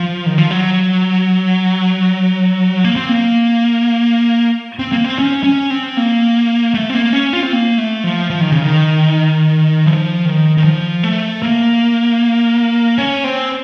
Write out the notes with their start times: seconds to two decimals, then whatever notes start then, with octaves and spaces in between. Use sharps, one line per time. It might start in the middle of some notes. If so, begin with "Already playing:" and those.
Already playing: F3
0.26 D#3
0.38 F3
0.51 F#3
2.84 A#3
2.96 C4
3.09 A#3
4.79 C4
4.92 A#3
5.04 C4
5.19 C#4
5.44 C#4
5.70 C4
5.97 A#3
6.74 A3
6.90 C4
6.94 A#3
7.13 C#4
7.33 F4
7.43 C4
7.53 A#3
7.78 A3
8.04 F3
8.30 F3
8.41 D#3
8.52 C#3
8.63 D#3
9.86 F3
10.25 D#3
10.57 D#3
10.64 F3
11.03 A3
11.43 A#3
12.98 C#4
13.24 C4